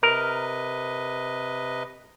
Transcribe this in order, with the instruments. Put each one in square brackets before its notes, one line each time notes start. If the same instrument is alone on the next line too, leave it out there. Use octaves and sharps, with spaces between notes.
[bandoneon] C3 B4 D#5 [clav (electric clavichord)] A#4